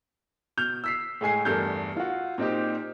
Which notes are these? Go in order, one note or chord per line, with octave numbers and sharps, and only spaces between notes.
B2 F6 G6 F7
E6 B6 C7
A2 G#3 G#5 C7
E2 G2 A3 A4 A#4 G6
F4 F#4
A#2 C4 D#4 G4